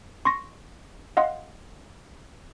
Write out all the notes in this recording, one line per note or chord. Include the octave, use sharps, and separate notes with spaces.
C6 C#6 A#6
D#5 F5 F#5 C6